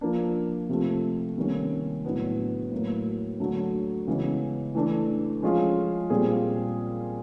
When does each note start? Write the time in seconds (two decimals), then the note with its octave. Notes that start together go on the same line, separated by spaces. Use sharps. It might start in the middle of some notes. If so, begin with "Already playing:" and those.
0.01 F3 A#3 D4
0.69 C3 F3 A3
1.37 C3 D#3 G3 A#3 C#4
2.04 A2 F#3 B3 D4
2.72 A2 F#3 A#3
3.40 D3 F#3 A3
4.07 C#3 E3 G#3 B3
4.75 E3 A3 D4
5.42 F3 G#3 C#4 F4 G#4
6.10 A#2 G3 C4 F4 G#4